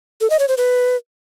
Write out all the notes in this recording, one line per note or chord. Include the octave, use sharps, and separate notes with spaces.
A4
D#5
C#5
C5
B4